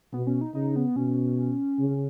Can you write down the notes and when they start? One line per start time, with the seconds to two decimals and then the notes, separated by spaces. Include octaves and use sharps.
0.13 B2 B3
0.27 C#4
0.41 D#4
0.55 C#3 D#4
0.76 B3
0.96 B2 C#4
1.79 C#3